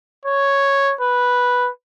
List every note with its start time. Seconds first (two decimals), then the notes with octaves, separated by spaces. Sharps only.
0.25 C#5
1.01 B4